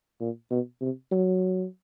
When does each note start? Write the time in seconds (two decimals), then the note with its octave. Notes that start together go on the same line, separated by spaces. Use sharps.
0.21 A#2
0.51 B2
0.81 C3
1.12 F#3